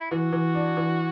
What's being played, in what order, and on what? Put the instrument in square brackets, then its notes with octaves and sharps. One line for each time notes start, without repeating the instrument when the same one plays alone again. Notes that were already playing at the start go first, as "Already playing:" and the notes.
[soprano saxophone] E4
[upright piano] E3 [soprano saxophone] F#4
[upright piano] E3
D4
E3